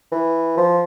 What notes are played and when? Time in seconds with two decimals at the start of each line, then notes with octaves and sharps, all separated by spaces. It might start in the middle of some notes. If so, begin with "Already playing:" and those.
0.12 E3
0.57 F3